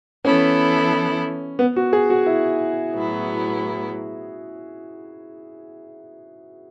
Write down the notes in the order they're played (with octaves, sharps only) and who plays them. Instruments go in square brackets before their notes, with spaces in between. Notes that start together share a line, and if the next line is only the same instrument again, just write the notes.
[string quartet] E3 B3 E4 A4 [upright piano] C#4
[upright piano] B3
F#4
G#4
F#4
E4
[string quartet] A2 F#3 B3 E4